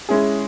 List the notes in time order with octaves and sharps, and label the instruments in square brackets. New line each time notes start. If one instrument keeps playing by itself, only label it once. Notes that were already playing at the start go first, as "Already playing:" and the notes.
[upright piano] G#3 C#4 E4 G#4